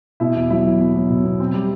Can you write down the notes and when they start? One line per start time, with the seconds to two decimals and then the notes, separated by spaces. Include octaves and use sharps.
0.20 B2 E4
0.36 E2
0.50 F#3 E4
0.65 F#3
0.80 B2
0.96 F#3
1.10 B2
1.24 B2
1.40 C4
1.54 G3